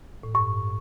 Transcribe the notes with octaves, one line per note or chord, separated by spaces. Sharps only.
A2
G2 C#6